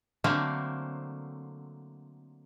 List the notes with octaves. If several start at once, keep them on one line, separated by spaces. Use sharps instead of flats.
D3 F#3 A3 A#3 C4